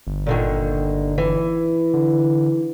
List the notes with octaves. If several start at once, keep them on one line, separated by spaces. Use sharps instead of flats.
G1
A#2 D3 D#3
E3
D3